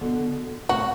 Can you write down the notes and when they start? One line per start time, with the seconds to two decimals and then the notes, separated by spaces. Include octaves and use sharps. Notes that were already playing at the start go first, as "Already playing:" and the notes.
0.01 B2 D3
0.69 A2 C3 F#4